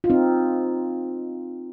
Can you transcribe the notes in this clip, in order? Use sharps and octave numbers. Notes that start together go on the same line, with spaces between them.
F4
C4 D#4